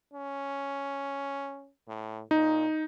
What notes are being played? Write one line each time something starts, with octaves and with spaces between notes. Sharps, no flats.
C#4
A2
A#2 D#4